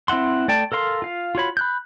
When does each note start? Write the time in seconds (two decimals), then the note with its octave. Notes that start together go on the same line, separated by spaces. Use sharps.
0.08 C4 E4 E5 F#5 C6
0.48 A3 D5 G5 A5
0.72 A4 A#4 F5 C6
1.02 F4 F5
1.35 F4 F#4 C#5 B5
1.57 B5 F#6 G6